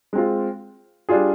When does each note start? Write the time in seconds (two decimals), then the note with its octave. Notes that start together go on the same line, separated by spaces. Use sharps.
0.13 G#3 C4 F4
1.09 G3 D4 F4 G#4